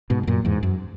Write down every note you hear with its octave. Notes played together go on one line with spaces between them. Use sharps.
G#2 B2
B2
F#2 A#2
E2 G#2
F#2